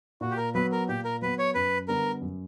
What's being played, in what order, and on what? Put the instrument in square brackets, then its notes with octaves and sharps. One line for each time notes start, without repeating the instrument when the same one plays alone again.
[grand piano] A#2 [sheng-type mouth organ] F#4
[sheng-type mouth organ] G4
A#4
[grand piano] F#3 B3 [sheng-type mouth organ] B4
[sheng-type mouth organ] A#4
[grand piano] A#2 [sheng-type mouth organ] G4
[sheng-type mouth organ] A#4
[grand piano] F#3 B3 [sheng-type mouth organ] B4
[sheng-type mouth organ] C#5
[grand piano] F#2 [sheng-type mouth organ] B4
[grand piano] D3 G3 B3 [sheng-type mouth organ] A#4
[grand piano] F#2